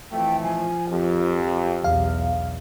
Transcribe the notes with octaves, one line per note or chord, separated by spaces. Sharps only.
F2 E3 A3 G5
F3 G#5
F2 G4
B1 E2 F5